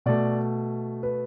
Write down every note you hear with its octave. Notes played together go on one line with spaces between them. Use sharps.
B2 A3 D5
B4